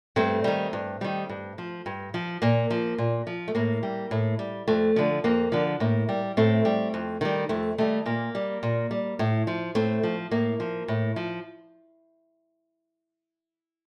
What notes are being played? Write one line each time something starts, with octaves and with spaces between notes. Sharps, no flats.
G2 A3 C4
D#3 G3
G2
D#3 G3
G2
F3
G2
F3
A#2 A#3
F3
A#2
F3
A3
A2 A#3
G3
A2
G3
F2 A3
D3 F3
F2 A#3
D3 F3
A2 A#3
G3
A2 A3 C4
G3
F2
D#3 G3
F2 A3
D#3 G3 A3
A#2 A#3
G3
A#2
G3
A2
F3
A2 A3 C4
F3
A2 A#3
F3
A2
F3